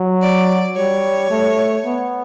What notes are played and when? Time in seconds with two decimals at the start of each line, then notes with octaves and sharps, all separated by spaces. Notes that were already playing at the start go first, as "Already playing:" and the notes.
Already playing: F#3
0.22 D5
0.76 G3 C#5
1.30 A3
1.85 B3